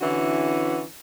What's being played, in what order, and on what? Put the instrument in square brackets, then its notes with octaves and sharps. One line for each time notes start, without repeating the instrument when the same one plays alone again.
[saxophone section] D3 E3 C#4 E4 F#4